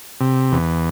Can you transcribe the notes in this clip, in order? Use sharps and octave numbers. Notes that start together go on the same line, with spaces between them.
C3
E2